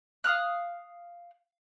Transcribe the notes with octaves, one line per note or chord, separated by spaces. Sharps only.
F5 D#6 F6 F#6